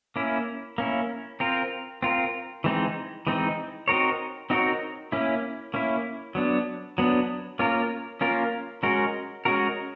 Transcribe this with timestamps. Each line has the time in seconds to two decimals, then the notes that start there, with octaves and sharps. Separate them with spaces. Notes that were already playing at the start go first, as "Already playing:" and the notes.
0.16 A#3 C#4 E4
0.78 A#3 C#4 E4
1.40 C4 F4 A#4
2.03 C4 F4 A#4
2.64 E3 G#3 C4 D#4
3.27 E3 G#3 C4 D#4
3.88 C4 D#4 F#4 A#4 C#5
4.50 C4 D#4 F#4 A#4 C#5
5.12 A#3 C#4 E4
5.74 A#3 C#4 E4
6.35 F#3 B3 D4
6.98 F#3 B3 D4
7.59 A#3 C#4 F4 A#4
8.21 A#3 C#4 F4 A#4
8.83 G#3 C#4 F#4 A#4
9.45 G#3 C#4 F#4 A#4